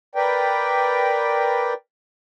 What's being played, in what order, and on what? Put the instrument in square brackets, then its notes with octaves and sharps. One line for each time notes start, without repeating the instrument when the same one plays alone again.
[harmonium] A#4 B4 D5 G5